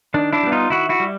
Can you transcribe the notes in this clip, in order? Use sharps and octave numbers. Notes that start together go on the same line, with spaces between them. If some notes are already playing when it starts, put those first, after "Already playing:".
D#3 D4
D4 E4
G3 B3
D#4 F4
D#3 E4 F#4
E4 F#4
G3